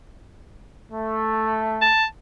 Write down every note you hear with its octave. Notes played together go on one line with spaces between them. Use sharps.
A3
A5